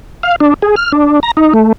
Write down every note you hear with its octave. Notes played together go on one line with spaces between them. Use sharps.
F5
D4
G#4
F6
D4
A#5
D#4
A3